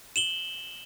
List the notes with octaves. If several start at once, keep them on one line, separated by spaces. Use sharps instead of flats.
E7 F#7 G7